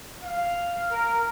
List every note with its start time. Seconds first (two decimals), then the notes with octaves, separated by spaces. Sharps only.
0.23 F5
0.90 A#4